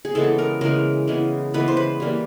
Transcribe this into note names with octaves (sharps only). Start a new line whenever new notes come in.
G#4
C#3 E3 G#3 B3 A4
A#4
C#3 E3 G#3 B3 A#4
C#3 E3 G#3 B3
C#3 E3 G#3 B3 B4
C5
B4
E3 G3 A#3